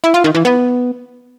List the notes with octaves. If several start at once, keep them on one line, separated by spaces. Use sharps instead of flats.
E4
F4
D#3
E3
B3